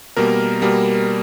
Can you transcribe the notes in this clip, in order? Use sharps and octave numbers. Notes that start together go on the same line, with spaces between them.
B2 G3 A#3 A#4
B2 G3 A#3